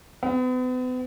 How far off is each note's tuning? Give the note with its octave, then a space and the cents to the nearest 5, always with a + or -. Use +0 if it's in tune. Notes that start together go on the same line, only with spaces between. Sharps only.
B3 +40